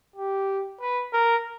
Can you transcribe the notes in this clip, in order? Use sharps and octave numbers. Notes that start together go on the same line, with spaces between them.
G4
B4
A#4